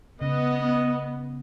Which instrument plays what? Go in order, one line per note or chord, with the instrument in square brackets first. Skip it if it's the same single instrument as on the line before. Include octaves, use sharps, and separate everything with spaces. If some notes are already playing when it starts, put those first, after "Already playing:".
[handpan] C#3 [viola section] B3 [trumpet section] D#5